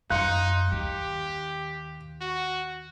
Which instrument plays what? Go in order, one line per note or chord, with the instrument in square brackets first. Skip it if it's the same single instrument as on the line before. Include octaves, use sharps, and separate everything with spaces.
[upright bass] F#2 [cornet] D#4 [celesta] F5 C6 C#7 [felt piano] F#6
[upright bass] D#2 [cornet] G4
[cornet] F#4